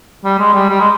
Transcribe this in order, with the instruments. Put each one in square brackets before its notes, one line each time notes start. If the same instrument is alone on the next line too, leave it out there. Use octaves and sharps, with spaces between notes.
[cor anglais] G3
G#3
G3
G3
G#3